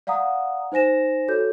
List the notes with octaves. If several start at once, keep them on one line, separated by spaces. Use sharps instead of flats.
D5 F5 F#5 A#5 D#6
D#4 C5 G#5 A#6 E7
F#4 A4 C#5 G6